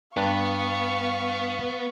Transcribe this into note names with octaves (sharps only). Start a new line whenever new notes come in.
G2 B3 D4 F5 A#5 C#6